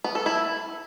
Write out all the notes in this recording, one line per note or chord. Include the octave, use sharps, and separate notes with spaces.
B3
A4
E4